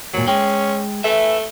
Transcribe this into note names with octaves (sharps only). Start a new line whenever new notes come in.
D#2 A#2 F#3
G#3 C#4 G5
A3 B4 E5